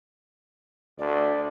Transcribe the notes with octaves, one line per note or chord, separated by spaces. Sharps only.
D2 D5